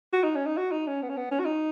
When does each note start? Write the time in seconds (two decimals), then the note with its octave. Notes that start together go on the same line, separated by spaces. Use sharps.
0.13 F#4
0.24 D#4
0.36 C#4
0.46 D#4
0.57 F#4
0.72 D#4
0.87 C#4
1.02 B3
1.09 C#4
1.17 B3
1.32 C#4
1.40 F#4
1.46 D#4